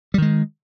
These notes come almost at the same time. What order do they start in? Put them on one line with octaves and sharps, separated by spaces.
G3 D#3 G#3